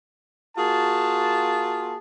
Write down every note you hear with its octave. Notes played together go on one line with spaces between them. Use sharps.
A#3 F4 F#4 G#4 A5